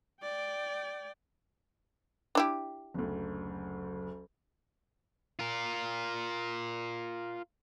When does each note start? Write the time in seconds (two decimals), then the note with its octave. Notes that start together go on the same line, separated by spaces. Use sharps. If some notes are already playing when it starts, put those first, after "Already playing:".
0.22 D5 G5
2.35 D4 E4 G4
2.94 F#1 D2
5.39 F4 A#4